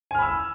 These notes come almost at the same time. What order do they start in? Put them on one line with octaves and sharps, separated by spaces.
G#5 F6 B5 E6